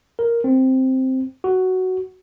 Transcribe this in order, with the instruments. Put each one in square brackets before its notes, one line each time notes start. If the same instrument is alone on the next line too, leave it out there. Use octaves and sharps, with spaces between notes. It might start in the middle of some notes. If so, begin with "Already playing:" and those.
[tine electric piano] A#4
C4
F#4